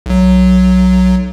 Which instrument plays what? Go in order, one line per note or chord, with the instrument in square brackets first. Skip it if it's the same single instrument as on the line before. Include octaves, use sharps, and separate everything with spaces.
[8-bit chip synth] B1 F#3